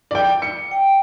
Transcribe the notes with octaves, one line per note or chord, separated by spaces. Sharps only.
D5 G5
C#7
G5